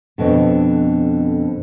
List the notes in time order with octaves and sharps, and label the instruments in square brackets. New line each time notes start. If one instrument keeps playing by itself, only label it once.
[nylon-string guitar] F2 B2 D3